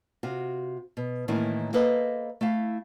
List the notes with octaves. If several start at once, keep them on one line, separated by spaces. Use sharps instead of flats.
C3 F4 F#4
B2
A2 D#3 E3 A#3 C#4 E4
A#3 A4 B4 C5 D#5
A3 E4 F5